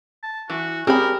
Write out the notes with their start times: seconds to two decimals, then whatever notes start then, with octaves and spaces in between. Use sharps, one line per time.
0.23 A5
0.50 E3 F#4
0.87 C4 G4 G#4 A#4 B5